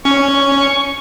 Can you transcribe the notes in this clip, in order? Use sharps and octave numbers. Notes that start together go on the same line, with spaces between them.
C#4 C#6